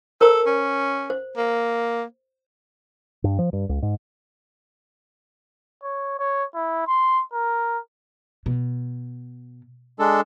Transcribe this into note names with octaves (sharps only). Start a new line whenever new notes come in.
A4 A#4 C5 A#5
C#4
C5
A#3
G2
F3
G2
C#2
G#2
C#5
C#5
E4
C6
A#4
B2
G#3 D4 A4